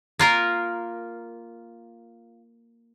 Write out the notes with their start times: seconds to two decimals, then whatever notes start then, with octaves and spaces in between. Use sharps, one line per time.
0.19 A#3 F4 A#4